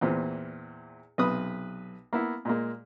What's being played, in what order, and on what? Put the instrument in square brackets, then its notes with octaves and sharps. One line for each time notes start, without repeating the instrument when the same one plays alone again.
[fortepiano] E2 A#2 E3 C4
B1 C3 B4 D#6
A#3 B3 E4
A#2 G#3 A#3